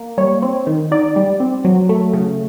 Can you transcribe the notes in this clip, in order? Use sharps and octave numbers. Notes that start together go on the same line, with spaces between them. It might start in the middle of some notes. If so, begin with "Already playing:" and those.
Already playing: A#3
G3 C#5
C4
D#3
D#4 D5
G3
C4
F#3
A3
C#3